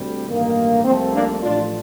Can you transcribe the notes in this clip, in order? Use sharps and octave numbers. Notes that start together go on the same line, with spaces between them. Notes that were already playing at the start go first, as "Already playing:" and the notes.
Already playing: D2 C3 G3
A1 G2 D#3 A#3
C2 C3 F3 A3 C4
A#3 D4
A1 A2 F3 A3 D4 F4